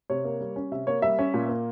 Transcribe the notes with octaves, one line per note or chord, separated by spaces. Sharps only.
C3 C#5
A#3
G3
C#4
C3 E5
A#3 C#5
G3 E5
C#4
A#2
A#3